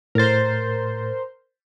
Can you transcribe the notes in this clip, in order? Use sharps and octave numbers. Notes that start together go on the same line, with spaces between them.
A2 A#4 C5 A6